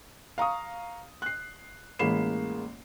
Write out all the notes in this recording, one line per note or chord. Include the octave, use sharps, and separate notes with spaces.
F5 A#5 C#6 D#6
F#6 C7
A1 G#3 A#3 B5 C7 E7